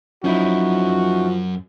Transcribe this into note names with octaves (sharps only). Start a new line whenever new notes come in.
F#2 F3 C#4 D#4 E4 F#4